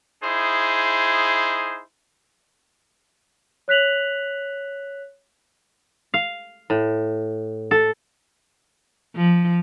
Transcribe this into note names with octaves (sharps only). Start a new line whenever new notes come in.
D#4 E4 G#4 C5
C#5 F#6 B6 F7 F#7
F5
A2
A4
F3